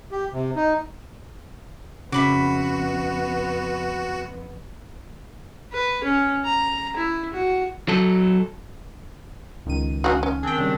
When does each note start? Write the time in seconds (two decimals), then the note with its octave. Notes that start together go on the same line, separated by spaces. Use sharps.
0.11 G4
0.33 C3
0.56 D#4
2.12 F2 C#3 B3 F#4 E5 B5 D6
5.73 B4
6.04 C#4
6.45 A#5
6.96 E4
7.33 F#4
7.88 F#3 A4
9.66 C#2 D#3 D#7
10.04 C#4 F4 F#4
10.23 C#4
10.43 D#3 C4 D4 G#4 G5
10.58 C#3 G3